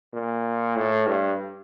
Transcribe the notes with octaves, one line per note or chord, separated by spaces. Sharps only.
A#2
A2
G2